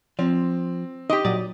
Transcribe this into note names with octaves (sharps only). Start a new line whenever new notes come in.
F3 C4
D#4 G4 D#5 C6 D6
A#2 F#3 D5 D#6